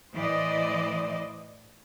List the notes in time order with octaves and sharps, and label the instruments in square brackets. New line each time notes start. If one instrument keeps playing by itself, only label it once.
[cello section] A2 E3 C5 D5 D#5